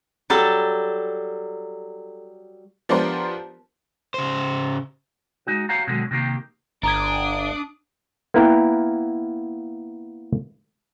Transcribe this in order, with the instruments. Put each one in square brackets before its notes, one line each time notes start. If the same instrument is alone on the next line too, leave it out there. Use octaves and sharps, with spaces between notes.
[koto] F#3 G3 A4
[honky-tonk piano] F3 B3 D4 G4 A#4 C5
[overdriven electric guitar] C#3 C5
[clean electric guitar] G#3 D#4 F#4
F#4 G4 C#5 F5 F#5 A#5
B2 D3 D#3 F#3 G#3
C3 D#3 A#3 G4
[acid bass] G1 [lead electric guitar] D4 [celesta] A#5 G#6 [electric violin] D#6 D7
[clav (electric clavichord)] A#3 B3 E4 A#4 B4 G5